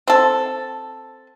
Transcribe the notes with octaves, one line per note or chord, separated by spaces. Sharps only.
C4 A4